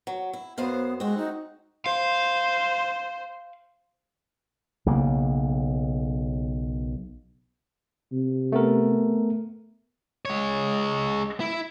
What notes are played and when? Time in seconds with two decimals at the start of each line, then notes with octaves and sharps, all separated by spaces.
0.07 F#3
0.33 E4
0.58 F#2 B3 C5 F5
1.00 G#3 C4 F#4
1.17 D#4
1.86 C5 F5
4.86 B1 C#3 A#3
8.13 C3
8.52 A3 B3 A#4
10.25 G#3 C#5
11.40 E4